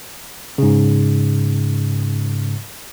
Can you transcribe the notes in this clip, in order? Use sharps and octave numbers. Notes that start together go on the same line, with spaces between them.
G#2 C#3